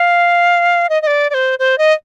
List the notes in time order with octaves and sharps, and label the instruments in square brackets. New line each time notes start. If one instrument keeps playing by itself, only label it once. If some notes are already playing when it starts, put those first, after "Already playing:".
Already playing: [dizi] F5
D#5
D#5
D5
D5
C5
C5
D#5